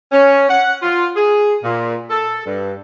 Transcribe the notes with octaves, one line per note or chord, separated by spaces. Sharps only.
C#4
F#5
F4
G#4
A#2
A4
G2